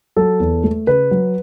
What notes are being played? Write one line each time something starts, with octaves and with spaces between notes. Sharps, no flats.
F#3 A4
E2
A3
C#3 B4
F#3